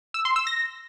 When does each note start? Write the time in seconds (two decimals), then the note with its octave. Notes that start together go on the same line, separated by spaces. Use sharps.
0.14 E6
0.25 C6
0.36 E6
0.47 A#6